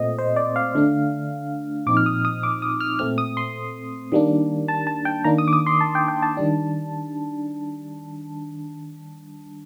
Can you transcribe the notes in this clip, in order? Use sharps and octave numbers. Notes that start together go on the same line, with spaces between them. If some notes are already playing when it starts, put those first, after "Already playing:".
Already playing: A#2 A3 C4 D#5
C5
D5
F5
D3 A3 D4
A#2 F3 C4 D#4 D6
F6
D#6
D#6
D6
D#6
F6
A#2 A3 C4 F6
D#6
C6
D#3 G3 A#3 D4
A5
A5
G5
D#3 A#3 D4 A#5
D#6
D6
D#6
C6
A5
G5
G5
A5
D#3 G3 D4